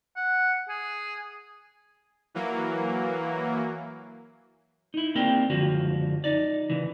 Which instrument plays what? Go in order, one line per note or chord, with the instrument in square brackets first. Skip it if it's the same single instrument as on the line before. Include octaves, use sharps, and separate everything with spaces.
[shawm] F#5
G#4
[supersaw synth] E3 F#3 A#3
[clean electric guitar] D#4 E4
A#3 C4 D4 G4 A#4 G5
C#2 F#2 D3 F3 F#4
D#4 D5
C#3 E3